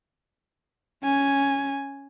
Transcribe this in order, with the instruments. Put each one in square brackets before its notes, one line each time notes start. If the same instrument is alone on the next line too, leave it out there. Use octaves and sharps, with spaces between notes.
[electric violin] C#4 G#5